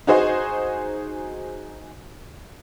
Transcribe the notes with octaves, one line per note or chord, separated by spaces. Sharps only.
D#4 F#4 G#4 C5 D#5